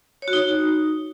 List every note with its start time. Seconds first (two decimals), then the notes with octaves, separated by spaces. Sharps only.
0.22 C#5
0.28 F#4
0.33 D#4